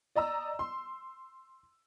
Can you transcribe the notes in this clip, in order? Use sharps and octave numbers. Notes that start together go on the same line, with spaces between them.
D5 D#5 A#5 E6
C6